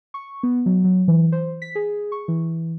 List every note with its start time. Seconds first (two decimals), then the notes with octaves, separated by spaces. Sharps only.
0.14 C#6
0.43 B3
0.66 F#3
0.84 F#3
1.08 E3
1.32 C5
1.62 B6
1.75 G#4
2.12 C#6
2.28 E3